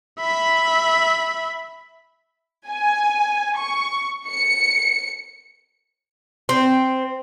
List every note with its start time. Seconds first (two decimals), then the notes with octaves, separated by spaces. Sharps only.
0.19 E5 B5
2.68 G#5
3.57 C#6
4.28 C#7
6.49 C4